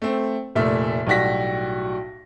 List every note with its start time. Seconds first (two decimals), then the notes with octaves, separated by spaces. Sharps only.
0.02 A3 C4
0.55 F1 A#2 A3 E5
1.07 B1 A2 G3 F#4 A#6 B6